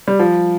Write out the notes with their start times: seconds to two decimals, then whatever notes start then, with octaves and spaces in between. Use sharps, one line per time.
0.08 G3
0.20 F3